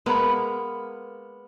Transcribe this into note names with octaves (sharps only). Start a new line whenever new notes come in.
G#3 A#3 B3 A#4 B4